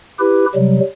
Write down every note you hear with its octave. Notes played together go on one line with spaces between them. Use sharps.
E4 G4 B4
C3 F#3 G3